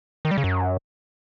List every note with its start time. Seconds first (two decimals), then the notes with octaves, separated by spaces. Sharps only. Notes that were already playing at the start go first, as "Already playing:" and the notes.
0.25 D#3
0.31 G3
0.38 C#3
0.44 F#2